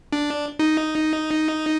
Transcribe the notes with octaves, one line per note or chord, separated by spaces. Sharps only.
D4
D#4